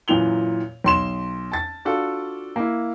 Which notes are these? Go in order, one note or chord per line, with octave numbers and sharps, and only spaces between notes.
F#2 A#2 E3 F7 G7
B1 C6 E7
A5 A6
D4 F4 F#4 A4
A#3 E4